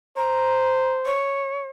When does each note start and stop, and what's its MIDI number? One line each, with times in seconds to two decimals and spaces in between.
0.17 1.15 72
0.17 0.94 82
1.05 1.68 73